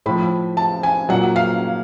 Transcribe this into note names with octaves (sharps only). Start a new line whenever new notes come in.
A2 F3 B5
A5
G#5
A#2 F#3 F#5
F5